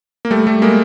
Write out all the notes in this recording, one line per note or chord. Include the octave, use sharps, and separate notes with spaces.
A#3
G3 A3
G3 A3
G#3 A#3